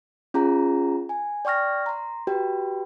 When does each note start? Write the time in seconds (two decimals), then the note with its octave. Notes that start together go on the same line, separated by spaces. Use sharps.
0.34 C#4 F4 G#4 A#5
1.09 G#5
1.45 D5 G5 C#6 F6 A#6
1.86 A#5 C6
2.27 F#4 G4 B4 G5